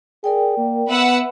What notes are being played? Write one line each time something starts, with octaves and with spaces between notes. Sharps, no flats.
G#4 A#4 D5 G5
A#3
B3 B4 E5 F#5 E6